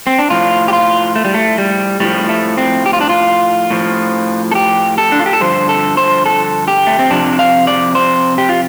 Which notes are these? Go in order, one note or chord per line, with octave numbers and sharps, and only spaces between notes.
C4
D4
A2 F3 F4
G4
F4
A3
G3
A3
G3
A2 F3 G3
A3
C4
G4
F4
D4
F4
A2 F3
A4
G4
A4
D4
F4
G4
A4
G2 D3 F3 C5
A4
C5
A4
G4
A3
C4
F2 C3 F3 D4
F5
D5
C5
G4
F4